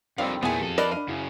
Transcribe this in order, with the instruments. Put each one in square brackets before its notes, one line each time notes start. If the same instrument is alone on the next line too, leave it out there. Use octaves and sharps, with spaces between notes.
[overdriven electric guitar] F2 D3 [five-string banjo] D#3 G3 C4 [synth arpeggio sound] F5
[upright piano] E2 A#2 [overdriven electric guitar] A3 G#4 [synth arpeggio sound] B3 G#5
[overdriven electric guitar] F2 A4 [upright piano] G4 D#7
[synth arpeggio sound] A#4 D#5 E7 [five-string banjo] B4 D5 F5
[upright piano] D4 B5 D#7 [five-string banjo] F5
[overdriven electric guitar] F#2 C#3 [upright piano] E4